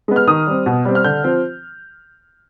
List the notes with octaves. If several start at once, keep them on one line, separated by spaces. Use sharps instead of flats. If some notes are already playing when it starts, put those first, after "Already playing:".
G#3 B3
F6
D#3 D#6
G3 C4
B2
G3 C4
F6
D3 G6
F3 C4